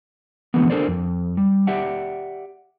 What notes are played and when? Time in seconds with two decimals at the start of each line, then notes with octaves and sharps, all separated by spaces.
0.54 D3 E3 F3 G#3 A3 B3
0.70 D4 A4 A#4 C5 D5
0.88 F2
1.37 G3
1.67 G4 D5 E5 F#5